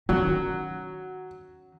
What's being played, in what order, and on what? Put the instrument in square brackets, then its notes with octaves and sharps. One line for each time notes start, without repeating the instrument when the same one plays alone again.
[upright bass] D#3 C#4 [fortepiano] F#3